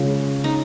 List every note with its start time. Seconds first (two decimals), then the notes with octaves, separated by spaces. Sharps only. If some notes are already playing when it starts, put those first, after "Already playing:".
Already playing: C#3 G#3 C#4 F4
0.44 D#4